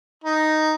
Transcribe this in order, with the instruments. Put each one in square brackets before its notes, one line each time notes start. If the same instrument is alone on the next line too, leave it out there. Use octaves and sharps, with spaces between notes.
[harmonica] D#4